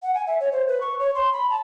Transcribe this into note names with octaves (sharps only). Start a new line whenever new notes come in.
F#5
G#5
E5
C#5
C5
B4
C#6
C#5
C6
B5
A5